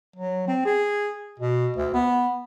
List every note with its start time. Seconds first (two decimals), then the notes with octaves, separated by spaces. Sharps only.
0.16 F#3
0.48 C4
0.65 G#4
1.40 B2
1.77 D2
1.94 B3